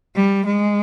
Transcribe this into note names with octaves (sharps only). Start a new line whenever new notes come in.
G3
G#3